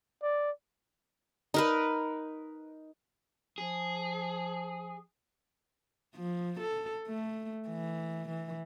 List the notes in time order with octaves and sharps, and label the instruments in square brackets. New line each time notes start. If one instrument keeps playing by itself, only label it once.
[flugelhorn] D5
[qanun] D#4 A#4 B4
[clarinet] F3 [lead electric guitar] G#4
[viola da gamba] F3
A4
A3
E3
E3